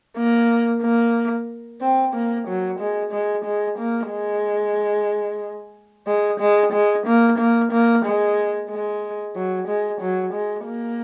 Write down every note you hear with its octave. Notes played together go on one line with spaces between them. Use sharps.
A#3
A#3
C4
A#3
F#3
G#3
G#3
G#3
A#3
G#3
G#3
G#3
G#3
A#3
A#3
A#3
G#3
G#3
F#3
G#3
F#3
G#3
A#3